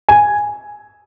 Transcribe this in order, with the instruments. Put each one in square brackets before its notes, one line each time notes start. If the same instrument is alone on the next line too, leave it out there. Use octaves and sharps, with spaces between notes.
[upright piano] G#5